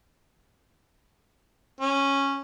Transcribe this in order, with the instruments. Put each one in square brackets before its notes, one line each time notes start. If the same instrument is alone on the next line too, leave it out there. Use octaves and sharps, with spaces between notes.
[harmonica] C#4